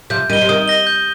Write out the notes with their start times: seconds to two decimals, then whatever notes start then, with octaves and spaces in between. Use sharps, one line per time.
0.10 C3 F3 G6
0.30 D#3 G3 D#7
0.33 G7
0.41 C3
0.49 D#3 D#6
0.67 A#6 G7
0.87 G6